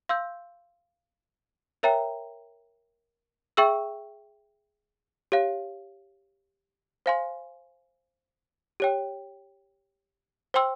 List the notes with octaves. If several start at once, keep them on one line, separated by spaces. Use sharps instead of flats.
F5 C6 E6 G6
A#4 C#5 E5 G5 A#5
G#4 E5 G5 C#6 E6
G4 C#5 F5
C5 F5 G#5 C6
G4 C#5 G5
C5 G5 C6 E6